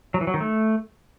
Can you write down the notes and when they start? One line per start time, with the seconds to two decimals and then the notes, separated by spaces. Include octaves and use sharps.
0.14 F#3
0.21 E3
0.27 F#3
0.34 D#3
0.40 A3